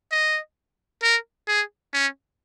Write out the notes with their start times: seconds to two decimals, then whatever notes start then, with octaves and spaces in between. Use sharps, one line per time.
0.12 D#5
1.03 A#4
1.48 G#4
1.93 C#4